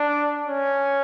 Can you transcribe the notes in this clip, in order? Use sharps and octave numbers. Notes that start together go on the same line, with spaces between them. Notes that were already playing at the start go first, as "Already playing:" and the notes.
Already playing: D4
C#4